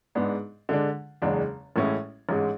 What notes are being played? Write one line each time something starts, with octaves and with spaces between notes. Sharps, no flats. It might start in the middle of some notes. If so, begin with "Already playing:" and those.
G#2 G#3 B3 D4
D3 G#3 D4
F#1 E2 C#3 G#3 D4
A1 A2 G#3 C#4 E4
A1 G#2 G#3